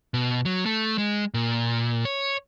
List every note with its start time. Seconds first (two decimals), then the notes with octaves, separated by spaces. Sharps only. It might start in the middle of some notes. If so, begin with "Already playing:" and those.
0.14 B2
0.45 F#3
0.66 A3
0.98 G#3
1.34 A#2
2.05 C#5